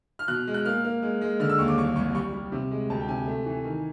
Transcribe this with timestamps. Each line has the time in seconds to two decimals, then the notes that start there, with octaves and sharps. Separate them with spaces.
0.19 F6
0.28 B2 F#6
0.47 G#3
0.54 F#6
0.65 A#3 F6
0.85 A#3
1.02 G#3
1.21 G#3
1.40 D3 F6
1.49 E6
1.59 D#2 C#6
1.68 D6
1.78 C2 C#6
1.96 C2 C#6
2.15 G3 C#6
2.33 G3
2.52 C3
2.71 G#3
2.90 D2 A5
3.00 G5
3.08 C3 G#5
3.28 A3
3.46 E3
3.64 D#3